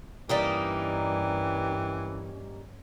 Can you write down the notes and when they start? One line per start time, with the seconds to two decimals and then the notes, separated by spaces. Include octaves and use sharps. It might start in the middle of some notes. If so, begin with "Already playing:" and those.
0.29 G2 E3 G3 A#3 C#4 D#4 G4